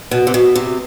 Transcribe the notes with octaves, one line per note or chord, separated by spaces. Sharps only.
B2
C3
B2
C3